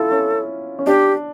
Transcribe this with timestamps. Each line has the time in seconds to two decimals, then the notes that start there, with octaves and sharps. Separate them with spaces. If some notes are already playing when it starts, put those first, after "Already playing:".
Already playing: E4 F4 A4
0.11 C#4
0.79 C#4
0.86 D4 G4